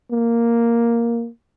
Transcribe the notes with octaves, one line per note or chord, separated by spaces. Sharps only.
A#3